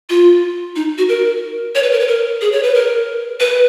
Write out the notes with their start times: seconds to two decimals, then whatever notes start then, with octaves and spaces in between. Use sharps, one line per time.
0.10 F4
0.76 D#4
0.98 F#4
1.09 A#4
1.75 C#5
1.83 B4
1.92 A#4
2.00 B4
2.08 A#4
2.41 G#4
2.52 C#5
2.63 B4
2.74 A#4
3.40 B4